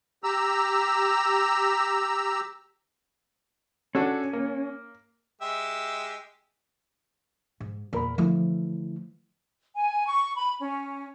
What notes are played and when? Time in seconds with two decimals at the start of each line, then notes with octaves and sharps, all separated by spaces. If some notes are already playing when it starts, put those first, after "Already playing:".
0.24 G4 A#5 E6
3.95 C#4 D4 F#4 A4
4.33 A#3
5.42 G#3 G4 E5
7.60 G#2
7.93 E2 A#2 A#4 B5
8.18 D3 E3 F3 A3 E4
9.75 G#5
10.06 C#6
10.35 B5
10.60 C#4